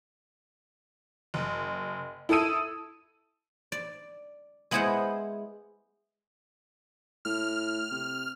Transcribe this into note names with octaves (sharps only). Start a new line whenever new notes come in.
F#1
E4 A4 D#6 E6 D#7
D5
G#3 B3 E4 G#4 C5 F#5
A2 F6
C3